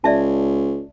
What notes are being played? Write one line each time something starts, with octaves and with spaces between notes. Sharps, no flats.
C#2 D5 E5 A5